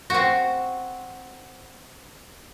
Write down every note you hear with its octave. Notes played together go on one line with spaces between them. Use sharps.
C4 F#4